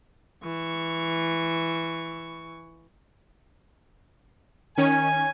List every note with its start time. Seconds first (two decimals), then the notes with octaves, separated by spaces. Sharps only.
0.43 E3 C#6
4.78 D#3 C#4 G#5